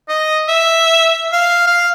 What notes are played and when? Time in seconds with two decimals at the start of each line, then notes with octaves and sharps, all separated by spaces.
0.09 D#5
0.48 E5
1.32 F5
1.67 F5